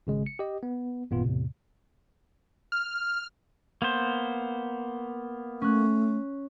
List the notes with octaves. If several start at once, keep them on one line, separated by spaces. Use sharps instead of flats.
G#1 C#3 G#3
C#7
G4 D#5
B3
G#1 F#2 A#2 B3 F4
E2 A2 C3
F6
A#3 B3 C5
A3 C#4 F#6